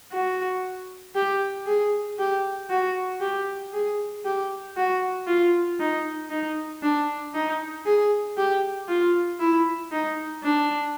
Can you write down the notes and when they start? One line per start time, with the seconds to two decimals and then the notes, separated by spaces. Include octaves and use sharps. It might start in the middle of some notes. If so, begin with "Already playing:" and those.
0.13 F#4
1.16 G4
1.67 G#4
2.19 G4
2.70 F#4
3.21 G4
3.73 G#4
4.25 G4
4.77 F#4
5.27 F4
5.80 D#4
6.30 D#4
6.83 D4
7.34 D#4
7.86 G#4
8.37 G4
8.88 F4
9.40 E4
9.92 D#4
10.43 D4